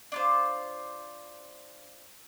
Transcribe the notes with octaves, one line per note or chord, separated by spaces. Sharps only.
D4 F4 C5